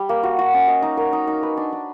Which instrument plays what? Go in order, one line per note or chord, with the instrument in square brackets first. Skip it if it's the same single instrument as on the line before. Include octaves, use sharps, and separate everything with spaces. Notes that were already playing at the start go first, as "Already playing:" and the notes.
Already playing: [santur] G3
A#3
F#4
F#4
C#4
D#5
D#4
A#4
D#4
D#4
B4
D4
D4